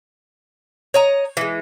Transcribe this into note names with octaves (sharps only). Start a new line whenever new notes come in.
C#5 D#5 A#5
E3 G#3